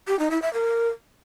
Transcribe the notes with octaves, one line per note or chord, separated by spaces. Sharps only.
G4
D#4
E4
E5
A#4